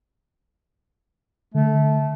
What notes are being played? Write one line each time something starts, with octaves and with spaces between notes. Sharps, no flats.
D3 A3